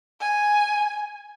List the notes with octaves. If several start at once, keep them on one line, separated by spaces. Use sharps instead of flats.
G#5